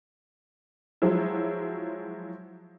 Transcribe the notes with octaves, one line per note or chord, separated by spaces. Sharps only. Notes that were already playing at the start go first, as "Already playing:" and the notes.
F3 F#3 G#3 E4